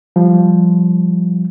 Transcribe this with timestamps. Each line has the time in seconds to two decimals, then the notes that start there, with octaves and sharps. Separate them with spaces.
0.16 F3 G3